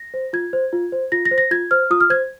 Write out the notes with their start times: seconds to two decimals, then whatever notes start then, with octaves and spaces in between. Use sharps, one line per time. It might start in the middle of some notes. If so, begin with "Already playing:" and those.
Already playing: A#6
0.14 C5
0.33 F4 G#6
0.53 C5
0.73 F4
0.92 C5
1.12 F4 A#6
1.25 A#6
1.31 C5
1.38 A#6
1.51 F4 G#6
1.71 C5 F6
1.91 F4 D#6
2.01 F6
2.10 C5 G#6